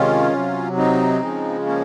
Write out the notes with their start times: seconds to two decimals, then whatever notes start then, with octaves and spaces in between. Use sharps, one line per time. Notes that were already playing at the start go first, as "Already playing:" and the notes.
Already playing: C3 D#3 G#3 C#4 F4
0.33 C3 F#3
0.77 C4 D#4
1.22 C#3 F3 G#3
1.66 A#3 C#4